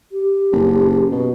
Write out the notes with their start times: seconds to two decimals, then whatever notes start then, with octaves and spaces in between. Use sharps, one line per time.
0.12 G4
0.52 F#1
1.11 B2